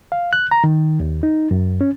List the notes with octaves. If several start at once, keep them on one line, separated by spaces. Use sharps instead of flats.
F5
F#6
A#5
D#3
D#2
D#4
F#2
C#4